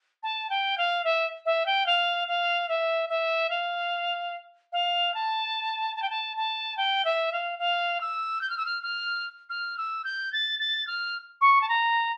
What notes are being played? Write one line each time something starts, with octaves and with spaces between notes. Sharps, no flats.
A5
G5
F5
E5
E5
G5
F5
F5
E5
E5
F5
F5
A5
A5
G5
A5
A5
G5
E5
F5
F5
E6
G6
F6
E6
F6
F6
F6
E6
G6
A6
A6
F6
C#6
A5
A#5